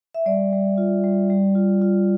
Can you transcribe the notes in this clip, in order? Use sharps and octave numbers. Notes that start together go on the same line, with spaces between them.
E5
G3 D5
G3
F4
G3
G3
F4
F4